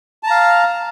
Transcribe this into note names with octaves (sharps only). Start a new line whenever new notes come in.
F5 A5 A#5